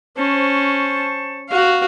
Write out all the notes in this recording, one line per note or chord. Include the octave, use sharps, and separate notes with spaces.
C#4 C5 A5 C#6
F#4 F5